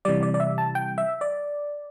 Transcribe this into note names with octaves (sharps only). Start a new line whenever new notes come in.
C3 E3 G3 D5
D5
D5
E5
A5
G5
E5
D5